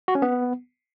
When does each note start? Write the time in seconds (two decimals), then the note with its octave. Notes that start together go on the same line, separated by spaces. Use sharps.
0.08 F#4
0.15 C#4
0.22 B3